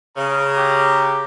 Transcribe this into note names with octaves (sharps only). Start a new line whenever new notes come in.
C#3 A#5
G4